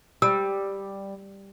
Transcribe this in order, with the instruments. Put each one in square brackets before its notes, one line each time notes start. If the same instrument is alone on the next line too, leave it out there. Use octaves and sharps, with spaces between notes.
[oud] G3 [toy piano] E6